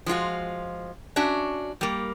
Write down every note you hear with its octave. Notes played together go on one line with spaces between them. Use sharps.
F3 G#3 F4 F#4
C#4 D4 F#4 E5
G3 A#3